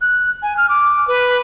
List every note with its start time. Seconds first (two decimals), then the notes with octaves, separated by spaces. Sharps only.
0.01 F#6
0.42 G#5
0.57 F6
0.69 D6
1.08 B4